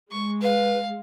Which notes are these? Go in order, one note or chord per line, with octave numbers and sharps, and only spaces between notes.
G#3 C#6
B4 F5